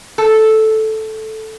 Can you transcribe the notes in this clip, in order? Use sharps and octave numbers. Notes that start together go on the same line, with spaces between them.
A4